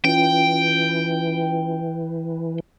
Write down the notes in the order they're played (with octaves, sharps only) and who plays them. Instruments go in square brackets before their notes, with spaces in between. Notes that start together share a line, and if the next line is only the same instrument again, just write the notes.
[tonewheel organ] E3 [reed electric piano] C#4 F4 [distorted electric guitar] G5